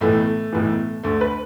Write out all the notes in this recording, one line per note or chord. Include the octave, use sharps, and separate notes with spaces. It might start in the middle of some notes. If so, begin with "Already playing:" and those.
B1 A2 E3 A3
B1 A2 E3
D2 D3 A3
B4